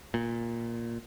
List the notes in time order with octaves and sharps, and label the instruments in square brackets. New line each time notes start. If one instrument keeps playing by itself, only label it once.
[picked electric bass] A#2